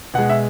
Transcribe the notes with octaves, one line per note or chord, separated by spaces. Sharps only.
B2 G#3 F#5
E5